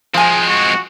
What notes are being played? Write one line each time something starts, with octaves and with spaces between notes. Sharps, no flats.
F3 G#3 C4 G#5
F#4